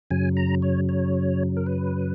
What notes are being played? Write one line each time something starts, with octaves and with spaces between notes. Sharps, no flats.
F#2 C#3 F#3 G#5
A#5
C#5
C#5
A#4
B4